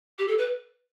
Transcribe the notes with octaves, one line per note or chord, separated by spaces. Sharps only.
G4
A4
B4